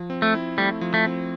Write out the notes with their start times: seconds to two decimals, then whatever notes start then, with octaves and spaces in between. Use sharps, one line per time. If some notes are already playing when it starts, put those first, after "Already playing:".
Already playing: F3
0.10 C4
0.22 A3
0.34 E4
0.57 G3 A3
0.81 F3
0.94 A3
1.06 C4